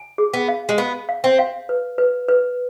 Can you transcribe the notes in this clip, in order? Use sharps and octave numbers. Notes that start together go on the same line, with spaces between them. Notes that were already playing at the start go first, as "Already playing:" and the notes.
Already playing: G#5
G#4
B3
F5
G#3
B3 F5
F5
C4
F5
B4
B4
B4